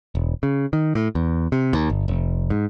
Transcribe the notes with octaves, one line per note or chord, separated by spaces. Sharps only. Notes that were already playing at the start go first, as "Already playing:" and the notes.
E1
C#3
D#3
A2
E2
C3
D#2
G1
F1
G#2